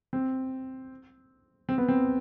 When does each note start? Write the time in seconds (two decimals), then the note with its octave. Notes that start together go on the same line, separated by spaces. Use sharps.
0.13 C4
1.69 C4
1.78 B3
1.88 C4